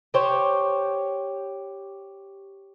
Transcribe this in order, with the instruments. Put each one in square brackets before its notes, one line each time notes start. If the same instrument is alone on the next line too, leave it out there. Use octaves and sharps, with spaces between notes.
[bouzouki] G4 C5 C#5